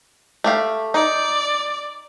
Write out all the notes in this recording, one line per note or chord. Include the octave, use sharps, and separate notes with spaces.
A3 G4 F5
D#4 D5